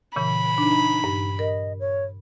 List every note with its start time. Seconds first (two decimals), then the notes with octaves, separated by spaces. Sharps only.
0.16 A#2 C#3 E3 B5
0.58 D4 D#4
1.04 G2
1.39 A#4 D#5
1.80 C#5